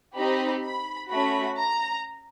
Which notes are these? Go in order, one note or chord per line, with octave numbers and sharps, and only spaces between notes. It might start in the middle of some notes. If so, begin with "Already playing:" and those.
C4 D#4 G4 B5
B5
A3 C#4 F#4 B5
A#5